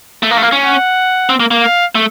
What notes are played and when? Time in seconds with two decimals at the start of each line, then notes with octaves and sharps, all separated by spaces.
0.23 A3
0.31 A#3 F5
0.37 A3
0.42 A#3
0.52 C#4
0.64 F#5
1.29 C4
1.40 A#3
1.51 A#3
1.63 F5
1.95 A3